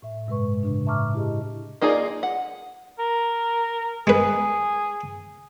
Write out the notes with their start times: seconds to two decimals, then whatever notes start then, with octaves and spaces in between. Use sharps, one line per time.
0.02 A2 E5
0.27 G2 C3 G#3 B4 C#6
0.63 A2 C#3 D4
0.86 E5 A5 A#5 C#6 D6 F6
1.14 E4 G4 G#4 D#5
1.81 A#3 D#4 F4 G#4 D5
2.23 F#5
2.99 A#4
4.07 G#3 G#4 B4